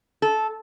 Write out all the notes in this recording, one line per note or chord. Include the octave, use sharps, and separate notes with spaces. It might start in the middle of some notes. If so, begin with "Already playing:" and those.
A4